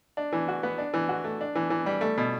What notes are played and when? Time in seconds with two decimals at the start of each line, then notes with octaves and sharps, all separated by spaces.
0.17 D4
0.33 E3
0.48 F#4
0.63 B3
0.78 D4
0.94 E3
1.09 F#4
1.24 A3
1.41 D4
1.55 E3
1.70 E3
1.86 G3
2.01 A3
2.18 B2